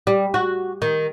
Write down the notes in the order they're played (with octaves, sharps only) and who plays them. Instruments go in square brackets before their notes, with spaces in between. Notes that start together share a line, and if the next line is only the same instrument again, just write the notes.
[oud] G3
F#4
D#3